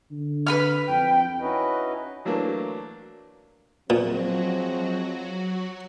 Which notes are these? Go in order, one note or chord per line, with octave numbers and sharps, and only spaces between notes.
D3
B4 B5 F6
F2 G5
C#4 D#4 E4 F#4 B4 D#5
E3 F#3 A3 A#3 D4
A#2 F3 F#3 G#3 C4 F#4